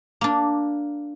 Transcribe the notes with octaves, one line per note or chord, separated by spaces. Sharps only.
A#3 D4